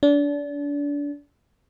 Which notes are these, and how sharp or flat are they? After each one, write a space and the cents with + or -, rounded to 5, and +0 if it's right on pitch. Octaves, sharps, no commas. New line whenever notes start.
D4 -30